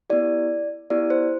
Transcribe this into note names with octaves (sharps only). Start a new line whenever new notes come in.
B3 E4 G4 D5
B3 E4 G4 D5
C5